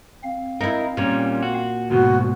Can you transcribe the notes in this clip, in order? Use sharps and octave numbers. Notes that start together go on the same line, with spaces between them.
C4 F5
D#4 E4 A#4
A#2 G3 C#4
F#4
D2 G#2 B2 F#4